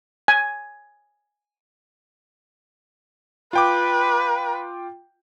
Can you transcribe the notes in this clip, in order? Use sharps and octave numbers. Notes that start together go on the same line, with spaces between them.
G#5
F4 B4 G5 D6